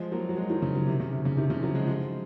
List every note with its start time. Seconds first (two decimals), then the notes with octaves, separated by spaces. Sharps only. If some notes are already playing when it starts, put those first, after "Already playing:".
Already playing: F3 G#3
0.12 F#3 A#3
0.29 F#3
0.36 F3 G#3
0.49 D#3 F#3
0.62 C#3
0.75 D#3 F#3
0.87 C3 D#3
1.00 C#3
1.12 C3
1.25 C#3
1.37 C3 D#3
1.49 C#3 F3
1.63 D#3 F#3
1.75 F3 G#3
1.87 F3 G#3